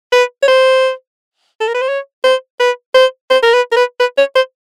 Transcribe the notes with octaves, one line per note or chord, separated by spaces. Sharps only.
B4
C#5
C5
A4
A#4
B4
C5
C#5
C5
B4
C5
C5
A#4
B4
A#4
B4
B4
C#5
C5